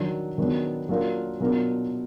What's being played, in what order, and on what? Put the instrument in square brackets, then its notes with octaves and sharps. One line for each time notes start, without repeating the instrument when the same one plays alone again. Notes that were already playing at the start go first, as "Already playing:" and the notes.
Already playing: [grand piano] D#3 F#3 D4
D#3 F#3 B3 D4
F#3 A#3 D4 F4 A#4
B2 F#3 D4 F4 A#4